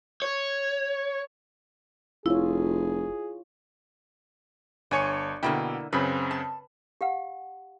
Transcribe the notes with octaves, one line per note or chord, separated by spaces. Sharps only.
C#5
F1 E4 F4 G#4 C#5
G1 D4 C#5 G#5 C#7
B2 D3 A#3 E4 G5
F#2 C#3 C4 B4
A5
G4 F5 F#5